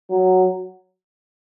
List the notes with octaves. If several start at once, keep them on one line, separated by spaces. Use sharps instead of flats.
F#3